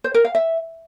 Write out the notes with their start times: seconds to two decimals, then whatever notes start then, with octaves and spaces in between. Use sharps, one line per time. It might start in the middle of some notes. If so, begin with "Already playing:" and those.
0.04 C5
0.14 A#4
0.25 F5
0.35 E5